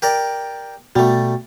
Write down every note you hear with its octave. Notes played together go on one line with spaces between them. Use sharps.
G4 A#4 D5
B2 G3 A3 F#4